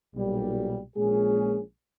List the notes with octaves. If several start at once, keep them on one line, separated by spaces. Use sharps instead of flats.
B1 A#2 G3
A#1 A#2 G#3 C#4 G#4